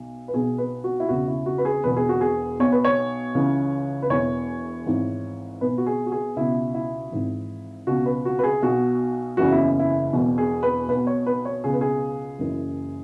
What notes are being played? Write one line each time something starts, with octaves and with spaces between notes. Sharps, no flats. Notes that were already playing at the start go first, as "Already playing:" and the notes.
Already playing: B1 B2
B4
B1 B2 G#4
B4
F#4
E4
E1 E2 C#3 F#4
E4
F#4
B4
G#4
E1 E2 B2 B4
G#4
F#4
G#4
B1 B2 C#5
B4
C#5
C#2 C#3 E3
B4
E1 E2 E3 C#5
G#1 G#2 E3
B1 B2 B4
F#4
G#4
F#4
G#4
C#2 B2 E4
E4
G#1 G#2 E3
C#2 B2 F#4
B4
F#4
B4
G#4
B1 B2 F#4
F#1 E2 C#3 E3 F#4
E4
E4
E1 E2 B2
G#4
B4
B1 B2 B4
C#5
B4
C#5
C#2 B2 G#4
B4
G#4
F#1 F#2 E3